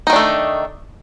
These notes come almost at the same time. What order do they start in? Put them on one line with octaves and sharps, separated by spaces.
D#4 D#3 D4 A3